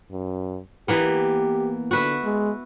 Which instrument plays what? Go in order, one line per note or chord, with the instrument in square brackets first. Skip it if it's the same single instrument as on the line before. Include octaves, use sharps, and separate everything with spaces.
[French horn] F#2
[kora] E3 A#3 B3 [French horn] G4
[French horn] D3 [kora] F#4 B4 E5
[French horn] G#3